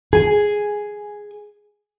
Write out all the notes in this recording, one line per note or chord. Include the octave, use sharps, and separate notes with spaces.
G#4 G#5